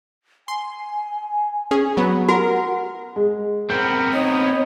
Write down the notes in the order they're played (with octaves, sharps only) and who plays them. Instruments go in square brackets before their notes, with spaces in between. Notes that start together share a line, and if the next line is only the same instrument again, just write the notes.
[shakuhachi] G#5 [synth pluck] C6
[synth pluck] C#4 G#4
[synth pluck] F#3 B3 [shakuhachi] B5
[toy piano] F#4 [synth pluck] A#4 [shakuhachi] F#5
[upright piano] G#3
[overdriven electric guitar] B3 C4 [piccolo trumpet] A#4 [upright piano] G6
[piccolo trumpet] D#4 [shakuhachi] C#5